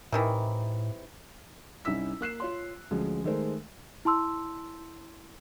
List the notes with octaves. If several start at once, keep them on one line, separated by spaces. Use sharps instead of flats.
A2 C3 D#3 E3
C2 C#4 D#4 E4 E6 B6
A#3 F#6 C7 E7
F4 C#5 C6
D2 F3 G#3 C#4
D#3 G#3 A3 A#4 C5
E4 A5 C6 E6